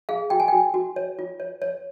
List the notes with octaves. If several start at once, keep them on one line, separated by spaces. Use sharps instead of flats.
G#4 F5
F#4 G5
G#5
F#4 G5
F#4
C#5
F4
C#5
C#5